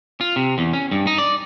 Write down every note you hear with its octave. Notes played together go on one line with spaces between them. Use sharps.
F4
C3
E2
C#4
G2
D#4
D5